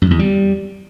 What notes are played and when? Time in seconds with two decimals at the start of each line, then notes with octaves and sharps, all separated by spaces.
0.02 F#2
0.10 E2
0.19 G3